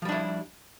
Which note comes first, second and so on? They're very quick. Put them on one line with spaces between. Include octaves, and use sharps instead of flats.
F3 G3 D4 E4